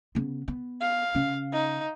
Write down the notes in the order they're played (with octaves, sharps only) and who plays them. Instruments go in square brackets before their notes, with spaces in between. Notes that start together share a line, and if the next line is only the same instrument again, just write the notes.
[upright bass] C#3 B3
B3
[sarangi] F5
[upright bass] C#3 C#4
[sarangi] D#4